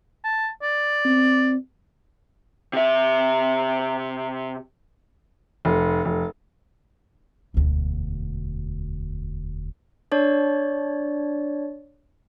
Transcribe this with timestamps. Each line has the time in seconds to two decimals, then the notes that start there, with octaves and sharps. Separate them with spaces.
0.24 A5
0.62 D5
1.05 C4
2.73 C3 E5
5.65 F1
6.05 F1
7.54 E1 D2
10.12 D4 C#5 D5